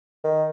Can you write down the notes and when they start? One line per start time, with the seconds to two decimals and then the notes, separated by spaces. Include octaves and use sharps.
0.24 D#3